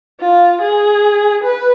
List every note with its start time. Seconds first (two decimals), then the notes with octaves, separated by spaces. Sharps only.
0.21 F4
0.61 G#4
1.44 B4